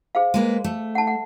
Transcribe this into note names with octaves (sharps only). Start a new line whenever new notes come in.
G#4 C5 F5
G#3 A#3 B4
A3
F#5 A5
F#5